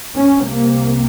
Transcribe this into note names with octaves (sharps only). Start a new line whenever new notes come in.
C2 C3 C#4
A#3